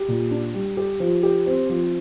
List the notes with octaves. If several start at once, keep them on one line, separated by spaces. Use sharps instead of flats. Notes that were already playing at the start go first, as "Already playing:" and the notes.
Already playing: G4
A#2
D4
G3
G4
F3
G4
C4
F3